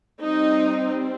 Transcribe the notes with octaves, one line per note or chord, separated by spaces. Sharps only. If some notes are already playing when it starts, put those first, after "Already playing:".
G3 C4 D#4